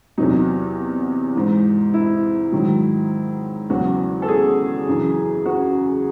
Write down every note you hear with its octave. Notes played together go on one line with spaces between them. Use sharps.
E2 C3 F#3 D#4
G#2 E3
E4
G#2 D#3 F#3
E2 C#3 F#3 F#4
A4
G#4
F#2 C#3 E3
F#4